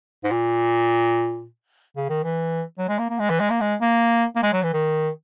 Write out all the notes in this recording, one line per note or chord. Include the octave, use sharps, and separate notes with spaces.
G#2
A#2
C#3
D#3
E3
F#3
G#3
A#3
A#3
G#3
E3
G#3
A#3
G#3
A#3
A#3
G#3
F#3
E3
D#3